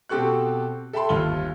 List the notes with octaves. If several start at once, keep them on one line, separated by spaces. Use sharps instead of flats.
B2 C4 G4 A4 C#6 F#6
A4 E5 G5 A5 B5 C6
G1 D#2 F4 G7